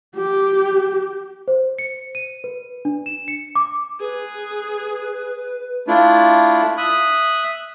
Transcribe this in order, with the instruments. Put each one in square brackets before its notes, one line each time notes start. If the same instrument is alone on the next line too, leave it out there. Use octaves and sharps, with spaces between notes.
[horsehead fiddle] G4
[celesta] C5
C#7
D#7
B4
D4
E7
C#7
D6
[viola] G#4 [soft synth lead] B4
[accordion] A3 D4 E4 F4
E5 D#6 F#6